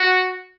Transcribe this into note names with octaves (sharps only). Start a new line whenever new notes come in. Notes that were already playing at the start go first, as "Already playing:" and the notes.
Already playing: F#4